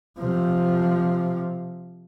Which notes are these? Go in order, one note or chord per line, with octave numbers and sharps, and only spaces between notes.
C3 F3